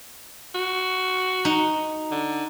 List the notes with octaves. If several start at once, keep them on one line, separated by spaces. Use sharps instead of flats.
F#4
D#4
D3